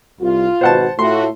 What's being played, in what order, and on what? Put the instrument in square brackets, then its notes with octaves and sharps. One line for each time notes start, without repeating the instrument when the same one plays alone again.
[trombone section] C2 [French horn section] F4
[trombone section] G#1 B2 [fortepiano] C5 F#5 A5
[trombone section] A2 [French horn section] A3 F4 F#4 [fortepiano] C6